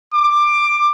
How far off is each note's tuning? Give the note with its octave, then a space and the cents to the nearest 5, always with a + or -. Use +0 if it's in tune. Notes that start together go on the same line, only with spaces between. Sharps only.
D6 +15